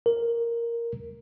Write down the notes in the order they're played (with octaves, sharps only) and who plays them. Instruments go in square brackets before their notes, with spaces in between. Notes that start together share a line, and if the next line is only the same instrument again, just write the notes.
[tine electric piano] A#4